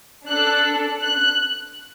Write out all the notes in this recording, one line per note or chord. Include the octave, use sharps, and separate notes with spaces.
D4 A4 F#6
F#6